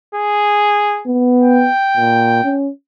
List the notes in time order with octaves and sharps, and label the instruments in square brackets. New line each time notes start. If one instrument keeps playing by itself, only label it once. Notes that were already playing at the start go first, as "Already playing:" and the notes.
[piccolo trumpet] G#4
[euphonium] B3
[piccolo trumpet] G5
[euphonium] A#2
C#4